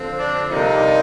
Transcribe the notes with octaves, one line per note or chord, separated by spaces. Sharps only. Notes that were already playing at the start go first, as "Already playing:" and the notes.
Already playing: D3 F3 C4
D4
C3 G3 A#3 D4 D#4